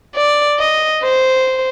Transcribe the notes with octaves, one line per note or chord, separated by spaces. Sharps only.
D5
D#5
C5